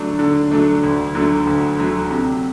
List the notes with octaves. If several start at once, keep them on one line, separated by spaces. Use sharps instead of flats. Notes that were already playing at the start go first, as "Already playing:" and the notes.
Already playing: D3 F#3 A3 D4
D3
F#3 A3 D4
D2
D3 F#3 A3
D2
D3 F#3 A3
C3